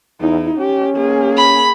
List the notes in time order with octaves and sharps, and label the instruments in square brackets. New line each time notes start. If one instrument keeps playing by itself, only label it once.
[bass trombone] E2 [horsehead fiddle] D#4 E4
[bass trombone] C#4 [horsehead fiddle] G4
[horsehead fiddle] A#3 G#4
[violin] B5